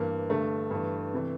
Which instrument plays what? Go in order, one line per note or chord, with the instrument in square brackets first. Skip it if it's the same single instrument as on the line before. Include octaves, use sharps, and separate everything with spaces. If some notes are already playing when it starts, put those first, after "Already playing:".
Already playing: [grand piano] G2 E3 A#3
G2 D3 A3
G2 E3
C3 E3